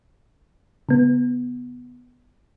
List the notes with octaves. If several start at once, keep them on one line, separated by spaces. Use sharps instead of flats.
C#3 B3